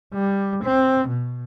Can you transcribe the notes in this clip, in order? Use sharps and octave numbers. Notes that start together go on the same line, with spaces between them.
G3
C4
B2